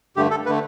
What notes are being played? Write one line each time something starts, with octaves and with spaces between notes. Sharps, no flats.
G2 D3 A3 G4
A4
B4
D3 A3